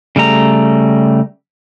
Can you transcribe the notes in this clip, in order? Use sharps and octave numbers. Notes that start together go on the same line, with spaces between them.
C#3 G3 A3 A#5